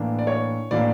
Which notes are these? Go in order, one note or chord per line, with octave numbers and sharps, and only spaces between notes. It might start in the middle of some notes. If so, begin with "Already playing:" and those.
Already playing: A2 E3 A#3 D4
D5
C#5
A2 E3 A#3 D4 D5